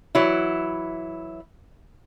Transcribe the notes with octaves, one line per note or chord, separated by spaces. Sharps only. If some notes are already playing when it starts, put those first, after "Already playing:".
E3 F#3 E4